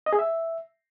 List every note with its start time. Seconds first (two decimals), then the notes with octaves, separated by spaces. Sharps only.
0.06 D#5
0.13 G#4
0.19 E5